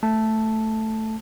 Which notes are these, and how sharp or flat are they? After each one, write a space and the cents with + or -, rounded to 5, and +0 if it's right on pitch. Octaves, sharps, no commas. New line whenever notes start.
A3 +0 A5 +0